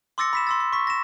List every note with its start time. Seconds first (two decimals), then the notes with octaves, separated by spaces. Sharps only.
0.18 C6 D6 E6 A6 A#6 C#7
0.33 B5 B6 E7
0.47 C6 E6 A6
0.60 C6
0.73 C#6 B6
0.87 A#6 E7